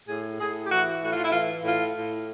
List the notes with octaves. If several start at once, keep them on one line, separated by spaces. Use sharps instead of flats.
A2 G#4
A2 G#4
G4
E3 F#4
A2 F#4
F4
E4
E3 F4
A2 F4
A2